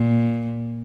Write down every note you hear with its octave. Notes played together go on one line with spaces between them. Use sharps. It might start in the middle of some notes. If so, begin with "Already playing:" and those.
Already playing: A#2